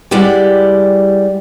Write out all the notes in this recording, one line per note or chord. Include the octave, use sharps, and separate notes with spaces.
G3 G#3 E4 G4 D5 F#5